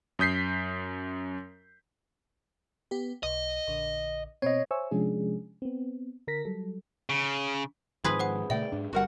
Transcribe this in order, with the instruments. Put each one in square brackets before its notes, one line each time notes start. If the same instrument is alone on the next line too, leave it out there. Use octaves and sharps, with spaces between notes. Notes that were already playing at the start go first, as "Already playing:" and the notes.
[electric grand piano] F#2 D#6 G6 B6 C7
[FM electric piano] B3 G4
[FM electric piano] B1 [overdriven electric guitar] D#5
[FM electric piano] A#1 D3
[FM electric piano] B2 C4 [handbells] C#5 D#5
[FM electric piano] C5 C#5 E5 G#5 C#6 E6
C3 F3 G#3 C#4 D4 G#4
B3 C4
D3 A#4 A#6 B6
F#3 G3 A4
[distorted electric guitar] C#3
[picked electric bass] G#2 D#3 F3 [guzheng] G#4 B4 [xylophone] C6
[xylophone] C5 F#5 D#6
[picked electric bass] A#2 C#3 A3 [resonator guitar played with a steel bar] D5 G5 [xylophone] E5
[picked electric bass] G#2 D4
[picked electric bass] G1 C3 G3 [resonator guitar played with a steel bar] F#4 A#4 F#5